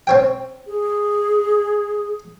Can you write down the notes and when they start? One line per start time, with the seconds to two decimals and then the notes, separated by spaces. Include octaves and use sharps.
0.07 C4 C#5 G5
0.67 G#4